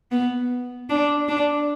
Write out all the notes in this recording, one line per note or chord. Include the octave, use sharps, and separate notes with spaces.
B3
D4
D4